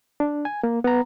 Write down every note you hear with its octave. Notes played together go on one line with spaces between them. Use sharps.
D4
G#5
A#3
B3 A#5